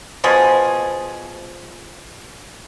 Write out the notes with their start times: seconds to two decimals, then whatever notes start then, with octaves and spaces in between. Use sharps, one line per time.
0.24 B2 F3 G#4